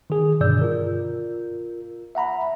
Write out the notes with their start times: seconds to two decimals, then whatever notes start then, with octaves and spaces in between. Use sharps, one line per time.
0.10 D#3 G#4
0.41 G2 B2 D3 D5 E6 G6
0.62 F4 A#4
2.15 E5 F#5 A#5 B5